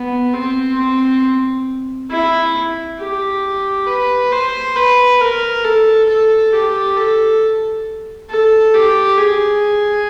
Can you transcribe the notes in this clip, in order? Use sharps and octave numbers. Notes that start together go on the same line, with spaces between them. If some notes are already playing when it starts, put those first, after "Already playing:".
Already playing: B3
C4
C4
E4
G4
B4
C5
B4
A#4
A4
A4
G4
A4
A4
G4
G#4